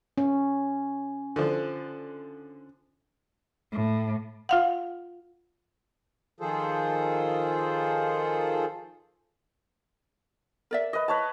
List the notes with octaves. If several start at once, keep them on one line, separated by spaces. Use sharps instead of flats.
C#4
D3 F3
A2
F4 F5 F#5
D#3 F3 F4 G#4 A4 C5
A#4 D5 E5
B4 D#5
B4 C#5 A5